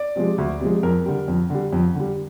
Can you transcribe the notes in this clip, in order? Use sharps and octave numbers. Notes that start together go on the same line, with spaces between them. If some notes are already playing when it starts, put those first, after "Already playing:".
Already playing: D5
C3 F3 G#3
D2
C3 F3 G#3
F2 A#4
D3 G3
F2
D3 G3
F2
D3 G3